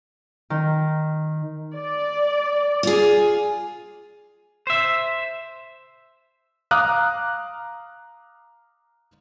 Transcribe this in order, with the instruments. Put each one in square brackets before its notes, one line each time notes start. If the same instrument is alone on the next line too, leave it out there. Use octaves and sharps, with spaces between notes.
[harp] D#3
[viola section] D5
[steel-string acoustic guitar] F4 G#4
[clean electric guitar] C5 E5
[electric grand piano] F5 A#5 D6 D#6 F6 F#6